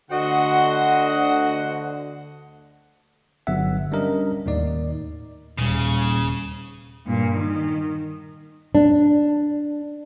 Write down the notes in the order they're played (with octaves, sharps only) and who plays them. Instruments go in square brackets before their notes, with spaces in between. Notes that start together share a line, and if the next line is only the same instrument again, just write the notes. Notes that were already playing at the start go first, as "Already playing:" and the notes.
[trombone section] D2 D3 [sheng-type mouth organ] F#4 [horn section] C5 D#5 F#5
[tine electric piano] G1 D3 F#3 B3 E5 F#5
G3 C#4 D4 A#4 D#5
D#2 A2 D#3 D#4 D5
[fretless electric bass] D#1 [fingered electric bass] A#2 G3 [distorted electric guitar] C#3
[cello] G2 A#2
D#3
[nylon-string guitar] D4